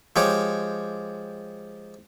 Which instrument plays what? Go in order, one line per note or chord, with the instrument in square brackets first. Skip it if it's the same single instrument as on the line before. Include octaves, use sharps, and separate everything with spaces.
[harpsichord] F3 G#3 G4 C#5